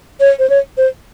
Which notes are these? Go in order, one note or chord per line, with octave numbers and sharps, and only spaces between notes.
C#5
C5
C#5
C5